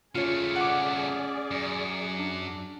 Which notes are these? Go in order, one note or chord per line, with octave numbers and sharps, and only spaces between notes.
C#3 A3 C#4 F4 G#4 C#5 D5
F#5 D6
F#2
D4